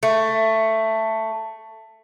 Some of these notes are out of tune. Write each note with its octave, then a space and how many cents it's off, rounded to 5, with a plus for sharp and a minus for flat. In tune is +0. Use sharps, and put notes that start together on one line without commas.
A3 +10